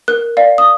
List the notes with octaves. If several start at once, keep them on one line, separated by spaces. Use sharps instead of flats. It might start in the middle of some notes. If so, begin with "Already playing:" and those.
A#4 F#6
D5 F5
D#6